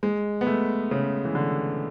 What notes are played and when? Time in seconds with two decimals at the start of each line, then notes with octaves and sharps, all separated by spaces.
0.03 G#3
0.41 B3
0.47 A3
0.91 C#3
1.25 E3
1.35 D3